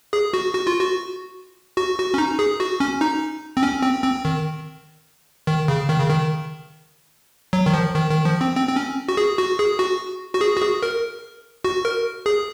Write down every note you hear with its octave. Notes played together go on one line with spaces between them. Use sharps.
G#4
F#4
F#4
F4
F#4
F#4
F#4
C#4
D#4
G#4
F#4
C#4
D#4
C4
C#4
C4
C4
D#3
D#3
C#3
D#3
C#3
D#3
F#3
D#3
F3
D#3
D#3
F3
C4
C4
C4
C#4
F#4
G#4
F#4
G#4
F#4
F#4
G#4
F#4
G#4
A#4
F#4
A#4
G#4